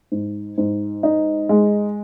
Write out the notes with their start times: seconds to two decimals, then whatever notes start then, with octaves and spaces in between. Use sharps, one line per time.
0.12 G#2
0.58 G#2
1.03 D#4
1.49 G#3